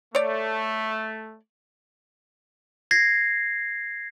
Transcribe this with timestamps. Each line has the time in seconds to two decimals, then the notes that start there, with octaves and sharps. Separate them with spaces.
0.15 A3 C#5 D5
2.91 G#6 A#6 C7